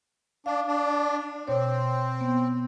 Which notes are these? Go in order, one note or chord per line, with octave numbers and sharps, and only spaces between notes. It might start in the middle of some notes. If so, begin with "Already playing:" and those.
D4 F5
D4
B2 C4 C#5
B3